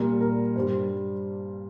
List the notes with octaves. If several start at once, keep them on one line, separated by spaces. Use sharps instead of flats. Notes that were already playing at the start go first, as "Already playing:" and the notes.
Already playing: A#2 G3 A#4
A#4
G2 G3 C5